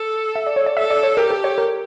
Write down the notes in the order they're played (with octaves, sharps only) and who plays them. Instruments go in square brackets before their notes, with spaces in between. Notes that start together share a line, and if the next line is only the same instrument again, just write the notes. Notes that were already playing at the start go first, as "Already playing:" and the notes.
Already playing: [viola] A4
[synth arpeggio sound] E5
D5
C#5
D5
[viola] A4 [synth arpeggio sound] E5
[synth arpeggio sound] D5
C#5
[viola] G4 [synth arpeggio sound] A#4
[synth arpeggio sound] A4
C#5
A#4